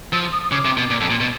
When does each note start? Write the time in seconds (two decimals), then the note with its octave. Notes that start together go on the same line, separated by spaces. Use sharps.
0.12 F3 E6
0.32 D#6
0.44 D#6
0.51 C#3 D6
0.65 C3
0.77 B2
0.90 A#2
1.01 F2
1.10 A#2
1.20 B2